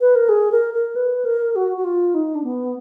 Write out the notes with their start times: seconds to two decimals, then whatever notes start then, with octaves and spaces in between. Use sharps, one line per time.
0.01 B4
0.15 A#4
0.29 G#4
0.52 A#4
0.74 A#4
0.96 B4
1.25 A#4
1.56 F#4
1.77 F#4
1.84 F4
2.14 D#4
2.35 D4
2.44 B3